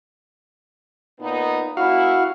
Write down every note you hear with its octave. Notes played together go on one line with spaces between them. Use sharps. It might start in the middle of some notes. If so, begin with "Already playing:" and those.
A#2 B3 D#4
A#3 C#4 E4 F#4 F5